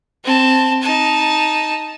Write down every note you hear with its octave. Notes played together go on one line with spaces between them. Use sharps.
C4 A5
D#4 A5